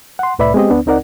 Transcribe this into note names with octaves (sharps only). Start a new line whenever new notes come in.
F#5 C6
C2 A2 B4 D5 E5 B5
G#3 B3 C4 G4 G#4 D#5
D2 B3 D4
C#2 C4 D#4 A#4 D5 F#5